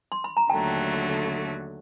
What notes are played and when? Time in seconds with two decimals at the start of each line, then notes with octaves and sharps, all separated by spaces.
0.12 C6
0.24 B5
0.37 A#5
0.50 D#2 D3 F#3 A3 G5 A5